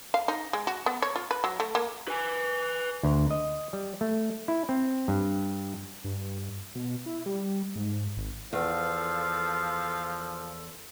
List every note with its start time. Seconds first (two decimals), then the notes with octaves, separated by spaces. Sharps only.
0.14 F5
0.28 D#4
0.53 G#3
0.67 F#4
0.86 B3
1.02 C#5
1.16 F4
1.31 B4
1.44 F#3
1.60 A3
1.75 A#3
2.08 B4 G#5
3.03 D2
3.31 D#5
3.73 G3
4.01 A3
4.48 E4
4.69 C4
5.08 G2
6.04 G2
6.75 B2
7.06 E4
7.26 G3
7.76 G#2
8.17 G#1
8.53 E2 F3 A4 F5